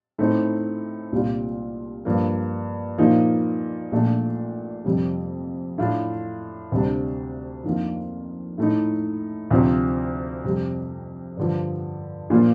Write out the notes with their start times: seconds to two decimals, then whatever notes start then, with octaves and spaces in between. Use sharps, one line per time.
0.18 A2 A3 C4 D#4
1.12 C2 A#2 G3 D4 F4
2.05 G2 F3 A#3
2.98 A#2 F3 A#3 D#4
3.92 A#1 A#2 A3 D4
4.85 F2 C3 G3
5.78 A2 A3 D4 F4
6.72 D2 C3 G3 D4
7.64 F2 D#3 A#3 D4 F4
8.58 A2 A3 D#4
9.51 D2 C3 F3 C4
10.44 F2 C3 G3
11.37 G2 D3 F3
12.30 A#2 F3 A#3 F4